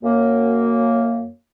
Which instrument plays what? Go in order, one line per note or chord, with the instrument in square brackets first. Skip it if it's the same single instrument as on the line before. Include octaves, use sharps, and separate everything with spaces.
[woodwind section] F#2 A#3